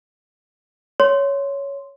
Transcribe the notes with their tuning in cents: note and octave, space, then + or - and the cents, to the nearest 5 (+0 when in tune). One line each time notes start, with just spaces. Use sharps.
C#5 +5 C6 -5